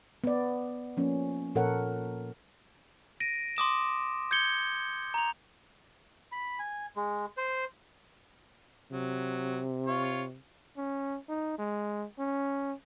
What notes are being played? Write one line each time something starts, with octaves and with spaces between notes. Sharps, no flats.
B3 D5
F3 A#3 C#4
A#2 F3 A4 A#4 C#5 F#5
A#6 D7 D#7
C6 D6 D#6 E7
G6 G#6 C#7 G7
A#5 F7
B5
G#5
G#3
C5
C3 F#3
F4 C#5
C#4
D#4
G#3
C#4